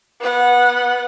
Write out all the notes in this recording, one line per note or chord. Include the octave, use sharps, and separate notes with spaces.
B3 F#5